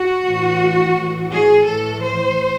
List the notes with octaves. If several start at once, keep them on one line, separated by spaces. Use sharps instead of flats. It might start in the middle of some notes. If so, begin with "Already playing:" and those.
Already playing: F#4
A2 E3
A2 E3
G#4
A2 E3 A4
C5